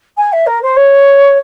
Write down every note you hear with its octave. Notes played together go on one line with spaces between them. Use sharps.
G#5
E5
A#4
C5
C#5